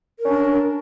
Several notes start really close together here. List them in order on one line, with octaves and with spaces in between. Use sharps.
A#4 C#4 D4